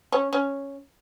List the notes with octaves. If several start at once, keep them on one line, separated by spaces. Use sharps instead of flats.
C#4
C#4